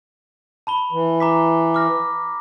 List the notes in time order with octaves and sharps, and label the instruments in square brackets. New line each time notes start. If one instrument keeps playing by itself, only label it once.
[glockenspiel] A5 B5 G7
[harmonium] E3
[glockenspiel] A#5 D6 B6
D6 F6 A#6